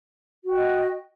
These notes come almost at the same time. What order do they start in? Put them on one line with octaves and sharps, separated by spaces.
F#4 G5 D#5